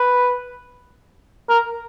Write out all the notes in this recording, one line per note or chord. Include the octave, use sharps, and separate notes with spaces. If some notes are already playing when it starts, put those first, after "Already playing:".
Already playing: B4
A#4